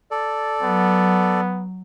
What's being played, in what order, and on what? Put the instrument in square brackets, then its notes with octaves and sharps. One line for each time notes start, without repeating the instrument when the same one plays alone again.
[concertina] A4 D5
[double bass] F#3 [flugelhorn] B3